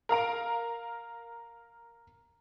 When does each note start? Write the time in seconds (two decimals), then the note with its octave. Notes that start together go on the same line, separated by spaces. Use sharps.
0.09 A#4 F5 A#5 D7